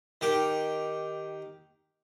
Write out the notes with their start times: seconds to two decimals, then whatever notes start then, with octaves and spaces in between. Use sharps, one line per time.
0.21 D#3 G4